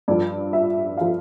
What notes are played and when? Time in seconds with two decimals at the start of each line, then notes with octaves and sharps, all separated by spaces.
0.08 G2 F3 D5
0.53 E5
0.97 F3 F5